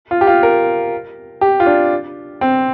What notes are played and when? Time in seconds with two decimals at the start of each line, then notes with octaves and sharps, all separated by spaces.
0.11 F4
0.21 G4
0.27 F4
0.43 A#4
1.41 G4
1.60 F4
1.66 D4
2.41 C4